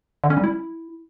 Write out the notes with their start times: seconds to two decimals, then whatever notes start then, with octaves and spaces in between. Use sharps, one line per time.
0.24 D3
0.30 C#4
0.37 G3
0.44 E4